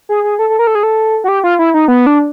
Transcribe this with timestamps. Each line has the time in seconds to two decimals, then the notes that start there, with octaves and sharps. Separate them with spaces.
0.09 G#4
0.24 G#4
0.39 A4
0.49 A4
0.59 A#4
0.67 A4
0.75 G#4
0.83 A4
1.24 F#4
1.28 G4
1.44 F4
1.59 E4
1.74 D#4
1.88 B3
2.06 D4